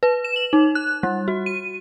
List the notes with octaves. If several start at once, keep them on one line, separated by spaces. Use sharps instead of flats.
B4
E7
F#7
D#4
F#6
G3
F#4
D#7